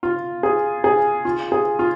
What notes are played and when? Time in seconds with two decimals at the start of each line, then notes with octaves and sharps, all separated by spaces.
0.03 F4
0.43 G#4
0.84 G#4
1.25 F4
1.52 G#4
1.79 F4